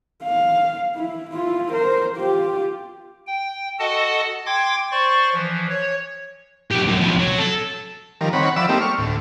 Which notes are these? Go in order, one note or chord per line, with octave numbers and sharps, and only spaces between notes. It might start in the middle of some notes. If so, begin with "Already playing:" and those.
F5
E4
E4 F4
A#4 C5
F4 G4
G5
F#4 A4 D#5 F#5 A5
G5 C6 D6 G#6
C5 D5 C6 C#6
E3 F3
C#5
B1 G4
F#2 A2
B1 F3
F#3
A4
D#3 F3 G3 A#4
D#3 C4 C#5 F#5 B5
F3 D5 E5 B5 E6
G3 A3 A#3 C4 D#4 G4
C#6 F6
D2 A2